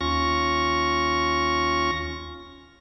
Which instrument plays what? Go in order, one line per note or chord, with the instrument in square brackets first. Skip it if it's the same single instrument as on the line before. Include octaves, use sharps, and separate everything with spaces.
[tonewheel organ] D#2 C#4 F4 C#6 A#6